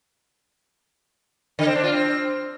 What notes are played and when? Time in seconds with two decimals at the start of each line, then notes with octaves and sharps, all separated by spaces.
1.59 D3
1.67 C4
1.75 D4
1.84 F4
1.92 C4